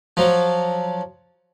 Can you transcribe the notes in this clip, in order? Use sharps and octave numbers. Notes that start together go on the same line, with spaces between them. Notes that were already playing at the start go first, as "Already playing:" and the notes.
F3 F#3